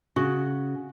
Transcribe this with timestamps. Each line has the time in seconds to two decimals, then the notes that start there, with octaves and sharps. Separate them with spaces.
0.16 C#3 F#4